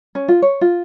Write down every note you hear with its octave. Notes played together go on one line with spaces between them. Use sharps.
C#4
F4
C#5
F4